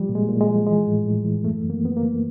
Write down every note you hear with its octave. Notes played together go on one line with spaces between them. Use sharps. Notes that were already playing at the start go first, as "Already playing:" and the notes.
Already playing: F3 G3
A#2
G#3
A#2
G#3
F3
E3 G#3
A2
A2
E3
F#2 A3
F#2
A#3
F3 B3
A#3
D3